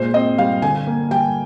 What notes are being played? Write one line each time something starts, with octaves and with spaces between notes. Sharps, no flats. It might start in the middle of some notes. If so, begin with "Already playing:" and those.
Already playing: A#2 G#3 C5
C4 D#5
G3 F5
D3 G#5
A#3
G3 G5